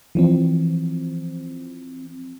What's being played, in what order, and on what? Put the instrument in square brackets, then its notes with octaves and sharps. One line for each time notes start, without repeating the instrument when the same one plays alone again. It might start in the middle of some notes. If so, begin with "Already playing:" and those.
[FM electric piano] E3 F3 C4